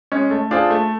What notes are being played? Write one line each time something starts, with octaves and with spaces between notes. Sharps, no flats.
G#3 C#4
A3
D4 F4 G#4 C5
A3